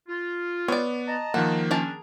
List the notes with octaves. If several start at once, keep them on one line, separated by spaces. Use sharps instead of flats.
F4
B3 C#5 D5
D#5 A5 A#5
D#3 F3 A#3 F#5
C#4 D4 G#4 A#4 A5